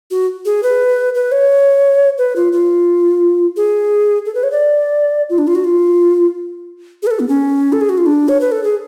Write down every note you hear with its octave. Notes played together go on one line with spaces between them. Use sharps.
F#4
G#4
B4
B4
C#5
B4
F4
F4
G#4
A4
B4
C#5
D5
F4
D4
F4
F#4
F4
G#4
B4
A4
B3
C#4
A4
G#4
F#4
F4
D4
C#5
B4
A4
G#4